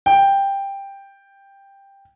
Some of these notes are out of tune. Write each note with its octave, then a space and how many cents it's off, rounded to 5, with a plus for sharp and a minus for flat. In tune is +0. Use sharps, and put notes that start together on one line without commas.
G5 +10